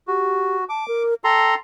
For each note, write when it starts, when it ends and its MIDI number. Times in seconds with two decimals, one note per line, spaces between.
0.08 0.64 66
0.08 0.56 67
0.69 0.87 81
0.69 1.03 86
0.88 1.14 70
1.24 1.55 69
1.24 1.55 79
1.24 1.55 82
1.24 1.55 84